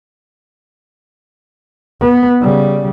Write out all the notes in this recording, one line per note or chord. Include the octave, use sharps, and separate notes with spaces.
B3
C#3 G3